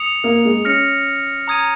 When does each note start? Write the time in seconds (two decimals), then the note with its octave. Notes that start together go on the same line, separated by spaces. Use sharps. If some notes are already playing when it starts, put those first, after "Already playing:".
Already playing: D#6 C#7 F7
0.24 A#3
0.45 G#3
0.65 C#4 F6 A#6 C#7 F7
1.48 A#5 D#6 G#6 D#7